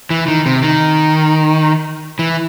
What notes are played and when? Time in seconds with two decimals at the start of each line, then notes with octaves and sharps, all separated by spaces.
0.10 E3
0.28 D#3
0.46 C3
0.63 D#3
2.19 E3